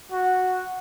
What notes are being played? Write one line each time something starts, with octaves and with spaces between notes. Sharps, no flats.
F#4